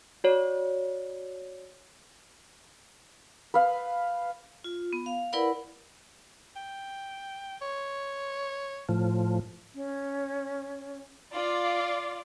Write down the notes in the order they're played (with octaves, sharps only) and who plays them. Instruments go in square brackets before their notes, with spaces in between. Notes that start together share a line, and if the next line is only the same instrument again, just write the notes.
[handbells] F#4 C#5 D5
[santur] B4 F5
[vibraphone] F4
B3
F5
E4 A#4 B4 D5 F#5 B5
[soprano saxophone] G5
C#5
[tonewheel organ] A2 F3
[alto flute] C#4
[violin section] F4 D5 [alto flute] F5